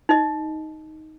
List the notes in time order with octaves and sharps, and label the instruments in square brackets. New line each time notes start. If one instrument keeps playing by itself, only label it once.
[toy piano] D#4 D#5